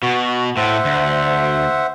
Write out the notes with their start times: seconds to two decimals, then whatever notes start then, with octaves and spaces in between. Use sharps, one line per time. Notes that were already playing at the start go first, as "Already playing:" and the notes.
0.03 B2 F#4
0.57 A2 C5 E5 F#5
0.85 D2